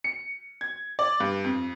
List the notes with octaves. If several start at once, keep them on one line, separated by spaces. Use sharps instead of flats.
C#7
G#6
D5
G2
F2